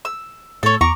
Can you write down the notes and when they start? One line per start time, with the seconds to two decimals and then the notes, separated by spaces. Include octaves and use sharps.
0.05 E6
0.63 A2 A4 C#5
0.81 E2 A#5 C#6 D6